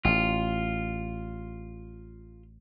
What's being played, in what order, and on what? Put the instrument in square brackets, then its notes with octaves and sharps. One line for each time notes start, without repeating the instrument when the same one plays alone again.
[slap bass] A1 [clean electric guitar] F4